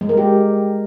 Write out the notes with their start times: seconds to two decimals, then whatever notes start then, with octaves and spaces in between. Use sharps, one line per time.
0.01 G#3
0.09 A#4
0.17 G4